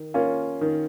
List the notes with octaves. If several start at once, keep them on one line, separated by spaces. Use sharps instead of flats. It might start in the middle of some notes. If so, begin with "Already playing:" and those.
Already playing: D#3
A#3 C#4 F4
D#3